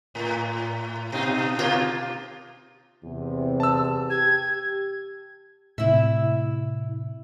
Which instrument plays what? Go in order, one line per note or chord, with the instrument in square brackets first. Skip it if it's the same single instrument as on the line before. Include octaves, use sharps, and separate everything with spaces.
[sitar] A2
B2 D#4
B2 A#3 F4
[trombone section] E2 C3
[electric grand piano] A5 E6
[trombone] G4 [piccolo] G#6
[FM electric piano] A2 C3 [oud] E4 E5